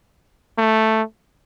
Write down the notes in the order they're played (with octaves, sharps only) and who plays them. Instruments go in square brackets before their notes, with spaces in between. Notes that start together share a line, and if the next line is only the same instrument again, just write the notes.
[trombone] A3